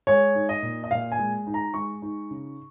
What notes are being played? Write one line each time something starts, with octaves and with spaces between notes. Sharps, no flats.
G#3 C#5
D#4
D#5
A#2
D#5
A#2 F5
G#5
G#3
D#4
A#5
G#3 C#6
D#4
C#3